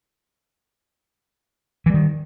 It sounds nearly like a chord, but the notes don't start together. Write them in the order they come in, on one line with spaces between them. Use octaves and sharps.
E3 G3 D#3